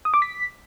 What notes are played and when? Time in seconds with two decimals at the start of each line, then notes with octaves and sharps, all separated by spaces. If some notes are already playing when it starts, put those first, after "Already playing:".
0.05 D#6
0.14 D6
0.22 B6